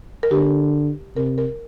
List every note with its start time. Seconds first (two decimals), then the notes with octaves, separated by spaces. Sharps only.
0.23 A#4
0.31 D3 G4
1.16 C3 A#4
1.38 A#4